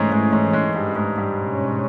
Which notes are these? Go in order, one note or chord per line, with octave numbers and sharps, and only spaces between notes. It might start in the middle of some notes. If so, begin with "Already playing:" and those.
Already playing: G#2 E3 G#3 A3 C#4
G#2 G#3
G#2 G#3
G#2 G#3
G2 G3
G#2 G#3
G2 G3
B2 G#3 C#4